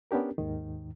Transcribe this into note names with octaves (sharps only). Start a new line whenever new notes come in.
B3 C#4 D4 G4 A#4
D#2 G#2 D#3